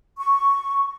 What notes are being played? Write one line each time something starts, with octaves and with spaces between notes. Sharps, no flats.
C#6